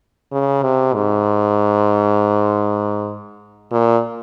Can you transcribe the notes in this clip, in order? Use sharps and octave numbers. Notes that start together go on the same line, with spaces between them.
C#3
C3
G#2
A#2